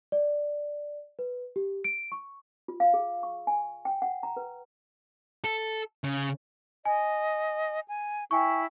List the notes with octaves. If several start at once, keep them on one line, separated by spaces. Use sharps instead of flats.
D5
B4
G4
D7
C#6
F4
F5
G#4
C#6
G#5
G5
F#5
A#5
B4
A4
C#3
D#5 G#5
G#5
E4 G5 G#5 C#6